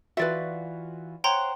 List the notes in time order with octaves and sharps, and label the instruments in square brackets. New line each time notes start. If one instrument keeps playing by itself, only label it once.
[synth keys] E3 F4 F#4 [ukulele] B4 D5 E5
[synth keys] C5 C#5 F#5 [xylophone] G5 A#5 C6